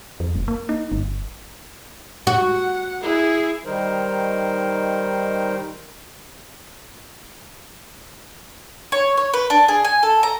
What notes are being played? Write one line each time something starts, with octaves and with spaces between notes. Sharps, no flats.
F2
F#1
A#3
D#4
G1
F#4 F#5
E4 G#4
D#3 G3 D#4 A#4 C5
C#5
C#5
B4
D4
G#4
G#5
A4
A#5